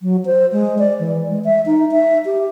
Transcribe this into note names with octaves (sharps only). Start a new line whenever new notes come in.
F#3
C5
G#3
D5
E3
G#3
E5
D#4
E5
G4